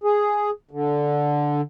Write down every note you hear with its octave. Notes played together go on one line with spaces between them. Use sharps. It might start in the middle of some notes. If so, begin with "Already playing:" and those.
G#4
D3